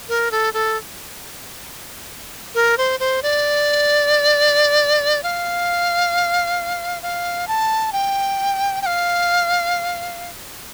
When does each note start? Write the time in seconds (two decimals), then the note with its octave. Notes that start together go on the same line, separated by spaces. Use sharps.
0.09 A#4
0.31 A4
0.53 A4
2.55 A#4
2.78 C5
3.00 C5
3.23 D5
5.23 F5
7.02 F5
7.48 A5
7.92 G5
8.82 G5
8.86 F5